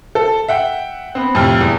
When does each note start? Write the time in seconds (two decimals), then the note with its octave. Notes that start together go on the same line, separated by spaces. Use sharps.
0.15 A4
0.48 E5 F#5 G5
1.15 B3 C4
1.35 F2 A2 C3 G5 F6
1.61 E2